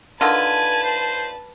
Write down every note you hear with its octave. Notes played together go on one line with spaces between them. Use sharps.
D3 D#3 F4 B4 G#5 A5
C5